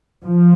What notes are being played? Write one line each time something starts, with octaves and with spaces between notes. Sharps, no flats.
F3